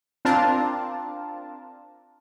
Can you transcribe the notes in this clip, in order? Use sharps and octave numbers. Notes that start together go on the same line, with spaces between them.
C4 D4 F4 A#4 A5